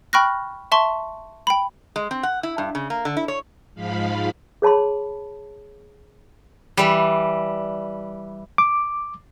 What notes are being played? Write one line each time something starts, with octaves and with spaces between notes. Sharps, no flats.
G5 B5 C#6 F6 F#6 A#6
E5 A5 C6 C#6
G5 B5
G#3
C4
F#5
E4
G2
C#3
A#3
D3
E4
C#5
G#2 F3 F5 B5
G#4 C#5 A5 B5 C6
E3 G3
D6